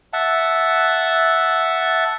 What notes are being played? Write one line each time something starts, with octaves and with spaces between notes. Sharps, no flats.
E5 F#5 A5